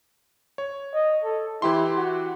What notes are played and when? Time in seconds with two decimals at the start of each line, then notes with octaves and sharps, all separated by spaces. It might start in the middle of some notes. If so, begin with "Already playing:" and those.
0.58 C#5
0.94 D#5
1.24 A4
1.62 E3 E4 G4 C6
1.97 F#4